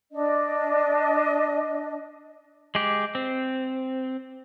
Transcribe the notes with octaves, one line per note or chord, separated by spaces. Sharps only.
D4 D#5
G#3 G4
C4